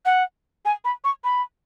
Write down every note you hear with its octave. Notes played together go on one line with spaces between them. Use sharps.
F#5
G#5
B5
C#6
B5